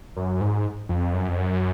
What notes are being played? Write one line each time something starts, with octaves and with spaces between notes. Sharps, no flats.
F#2
G#2
F2
F#2
F2
F#2